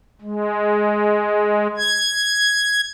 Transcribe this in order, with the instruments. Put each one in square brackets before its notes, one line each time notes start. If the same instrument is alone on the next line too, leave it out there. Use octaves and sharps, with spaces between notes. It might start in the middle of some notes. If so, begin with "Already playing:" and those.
[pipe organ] G#3
G#6